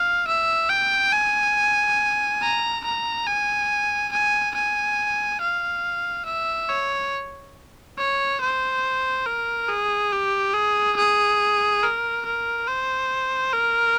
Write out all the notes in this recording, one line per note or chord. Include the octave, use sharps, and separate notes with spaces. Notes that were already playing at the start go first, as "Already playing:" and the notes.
Already playing: F5
E5
G5
G#5
A#5
A#5
G#5
G#5
G#5
F5
E5
C#5
C#5
C5
A#4
G#4
G4
G#4
G#4
A#4
A#4
C5
A#4